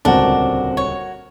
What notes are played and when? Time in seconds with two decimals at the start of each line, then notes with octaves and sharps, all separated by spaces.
0.05 D#1 C#2 D3 C4 D4 F#4 A#4 C5
0.77 C#5